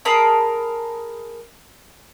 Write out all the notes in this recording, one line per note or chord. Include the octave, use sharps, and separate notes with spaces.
G#4 A#4 A5 B5